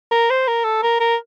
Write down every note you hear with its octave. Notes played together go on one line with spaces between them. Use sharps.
A#4
C5
A#4
A4
A#4
A#4